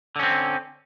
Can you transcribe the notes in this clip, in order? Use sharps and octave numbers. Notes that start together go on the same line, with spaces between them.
D3 C4 C#4